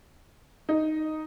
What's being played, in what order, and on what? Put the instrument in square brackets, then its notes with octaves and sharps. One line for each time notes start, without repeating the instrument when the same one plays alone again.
[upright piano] D#4